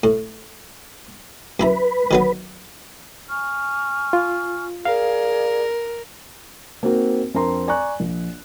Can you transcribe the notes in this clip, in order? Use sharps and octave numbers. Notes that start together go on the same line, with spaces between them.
A2
F#2 E4 B4 A#5
D#3 F#3 B3
G#5 C#6 F6
F4
G#4 A#4 D5 F5
A#3 C4 D#4 F#4 A#4
F2 C4 D4 A#4 A#5 C6
D5 G#5 A#5 C#6 F#6
A#1